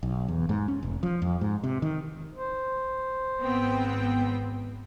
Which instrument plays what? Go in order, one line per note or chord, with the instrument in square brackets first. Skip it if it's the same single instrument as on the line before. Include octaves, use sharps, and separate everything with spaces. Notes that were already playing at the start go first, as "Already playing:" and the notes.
[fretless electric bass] B1
E2
G#2
C#4
F1
F3
F2
G#2
C3
D#3
[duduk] C5
[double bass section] G#1 [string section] B3 C4 G5